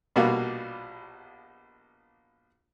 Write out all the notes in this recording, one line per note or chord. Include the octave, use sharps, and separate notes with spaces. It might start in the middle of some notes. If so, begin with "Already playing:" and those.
A#1 B2 G3 A#3 F#4 F5